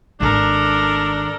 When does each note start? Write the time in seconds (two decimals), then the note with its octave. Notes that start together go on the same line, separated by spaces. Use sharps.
0.20 G#1 D#3 D4 A4 A#4